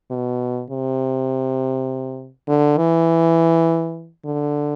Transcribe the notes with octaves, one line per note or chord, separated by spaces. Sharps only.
B2
C3
D3
E3
D3